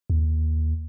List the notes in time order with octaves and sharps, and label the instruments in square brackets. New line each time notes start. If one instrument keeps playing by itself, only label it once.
[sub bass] D#2